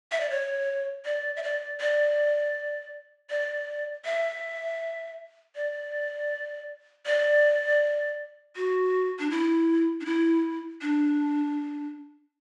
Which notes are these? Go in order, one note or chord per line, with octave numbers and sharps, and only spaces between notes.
E5
D5
C#5
D5
E5
D5
D5
D5
E5
D5
D5
F#4
D4
E4
D4
E4
D4